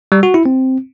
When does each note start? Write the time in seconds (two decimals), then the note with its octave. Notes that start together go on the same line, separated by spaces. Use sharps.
0.12 G3
0.23 F#4
0.34 E4
0.46 C4